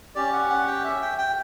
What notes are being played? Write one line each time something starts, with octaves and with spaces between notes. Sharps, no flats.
C#4 G4 D5
F#5
F#5
G5
E5
G5
G5